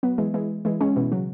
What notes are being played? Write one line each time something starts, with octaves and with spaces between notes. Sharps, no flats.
F#3 B3
E3 G#3
E3 G#3
E3 G#3
G#3 C#4
B2 E3
C#3 F#3